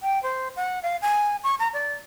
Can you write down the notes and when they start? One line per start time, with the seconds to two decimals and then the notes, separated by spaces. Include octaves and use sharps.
0.01 G5
0.23 C5
0.56 F#5
0.83 F5
1.02 G#5
1.44 C#6
1.59 A#5
1.73 D5